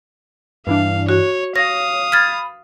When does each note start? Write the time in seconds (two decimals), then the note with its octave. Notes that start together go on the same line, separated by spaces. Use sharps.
0.67 G2 E3 D4 F5
1.09 F#4 C#5
1.56 C#5 F5 D#6 A#6
2.12 B5 F6 G#6 A6